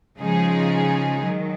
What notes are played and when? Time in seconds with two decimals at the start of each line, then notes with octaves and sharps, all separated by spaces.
0.18 C#3 F3 G#3 D#4 G#4
1.25 D#3 F#3